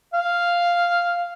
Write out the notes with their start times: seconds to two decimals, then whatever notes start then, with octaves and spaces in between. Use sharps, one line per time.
0.14 F5